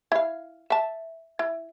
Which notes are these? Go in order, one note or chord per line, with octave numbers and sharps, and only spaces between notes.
E4 F5
E5 A5
E4